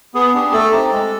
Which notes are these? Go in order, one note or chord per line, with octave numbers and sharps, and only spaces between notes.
B3 G#4
D4 G4
A3 A4
C4 D#4 G4
G#3